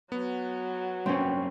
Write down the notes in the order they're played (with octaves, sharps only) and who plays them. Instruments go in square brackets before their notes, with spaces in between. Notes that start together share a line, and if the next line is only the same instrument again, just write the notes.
[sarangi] F#3 [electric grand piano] B3
[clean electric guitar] F#2 A#3 C5 [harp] C4 C#4